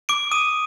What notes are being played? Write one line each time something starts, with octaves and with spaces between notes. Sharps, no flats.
D6 D7
D#6 D#7